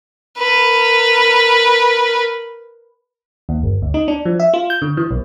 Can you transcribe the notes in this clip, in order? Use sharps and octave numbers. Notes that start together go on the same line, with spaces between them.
A#4 B4
D#2
G1
D2
D#4
D4
F3
E5
F4
G6
D3
E3
B1